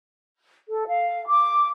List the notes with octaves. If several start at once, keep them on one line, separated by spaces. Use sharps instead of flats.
A4
F5
D6